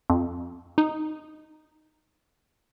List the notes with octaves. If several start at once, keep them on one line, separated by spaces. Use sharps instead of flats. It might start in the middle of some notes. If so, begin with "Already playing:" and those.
F2
D#4